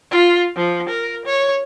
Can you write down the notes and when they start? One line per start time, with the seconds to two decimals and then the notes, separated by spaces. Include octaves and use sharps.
0.11 F4
0.56 F3
0.89 A#4
1.25 C#5